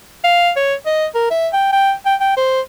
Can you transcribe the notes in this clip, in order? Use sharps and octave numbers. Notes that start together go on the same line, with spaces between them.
F5
C#5
D#5
A#4
E5
G5
G5
G5
G5
C5